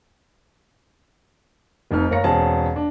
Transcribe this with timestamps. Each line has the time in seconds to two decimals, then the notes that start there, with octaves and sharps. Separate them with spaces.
1.91 F1 F2 D#4 F6
2.10 F#1 A#4 C#5 F5 A#6 C#7
2.24 E1 C4 G#4 C#5 A5
2.76 D4